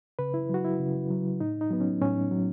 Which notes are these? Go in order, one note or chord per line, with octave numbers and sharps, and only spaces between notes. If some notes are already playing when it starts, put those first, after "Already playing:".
C#3 B4
E4
F#3 F#4
E4
C#3
F#3
A2 D#4
D#4
F#3 B3
C#4
A2 C#4
F#3